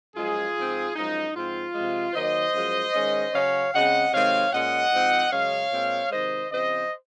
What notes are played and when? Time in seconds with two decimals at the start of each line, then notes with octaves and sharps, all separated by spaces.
0.15 F#2 F3 G#3 F4 G#4
0.56 G#2 F3 C4
0.95 F#2 F3 G#3 D#4
1.34 G#2 F3 C4 F4
1.74 C3 F3 G#3
2.14 D#3 F#3 A#3 C5 D#5
2.53 F#2 F3 G#3
2.94 D#3 G#3 C#4
3.33 C#3 F#3 C#4 C#5 F5
3.73 C#3 G#3 C4 D#5 F#5
4.12 C3 D#3 G#3 C4 C#5 F5
4.52 A#2 G#3 C#4 D#5 F#5
4.92 G#2 F3 C4
5.32 F#2 C#3 G#3 C#5 F5
5.72 A#2 G#3 C4
6.11 C3 D#3 G#3 C5 D#5
6.51 C#3 F3 C4 C5 D#5